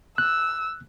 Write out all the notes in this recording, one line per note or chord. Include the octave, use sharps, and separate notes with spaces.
E6 F#6